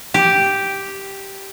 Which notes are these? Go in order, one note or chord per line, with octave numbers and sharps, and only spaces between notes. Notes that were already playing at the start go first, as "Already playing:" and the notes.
G4